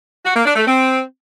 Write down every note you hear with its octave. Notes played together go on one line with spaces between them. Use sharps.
F#4
A#3
D4
A3
C4